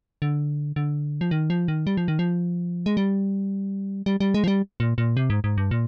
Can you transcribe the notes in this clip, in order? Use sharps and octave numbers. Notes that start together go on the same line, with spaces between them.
D3
D3
F3
D#3
F3
D#3
G3
F3
D#3
F3
G#3
G3
G3
G3
G#3
F3
G3
A#2
A#2
C3
G#2
G#2
G2
A#2